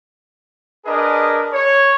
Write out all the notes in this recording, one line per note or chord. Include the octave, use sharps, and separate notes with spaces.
D4 G#4 A#4 B4 D#5
C#5